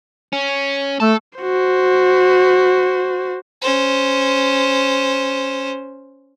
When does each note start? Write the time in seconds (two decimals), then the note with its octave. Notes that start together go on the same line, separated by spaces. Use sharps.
0.33 C#4
1.00 A3 A4
1.39 F#4 C5
3.62 C#4 C5